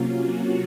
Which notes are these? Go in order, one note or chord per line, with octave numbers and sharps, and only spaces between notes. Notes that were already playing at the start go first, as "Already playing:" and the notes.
Already playing: C3 F#3 A#3 C#4 F4
F#4